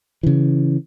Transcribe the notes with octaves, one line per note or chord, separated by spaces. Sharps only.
C#3 E3